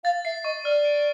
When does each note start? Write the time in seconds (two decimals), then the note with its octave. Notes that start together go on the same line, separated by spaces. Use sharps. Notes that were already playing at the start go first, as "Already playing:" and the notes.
0.04 F5 A6
0.25 E5 C7
0.44 D#5 C#6
0.64 D5 F6
0.85 D7